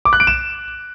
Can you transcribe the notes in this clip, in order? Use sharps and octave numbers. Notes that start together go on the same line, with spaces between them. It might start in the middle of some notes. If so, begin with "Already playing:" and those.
D6
F#6
D7
E7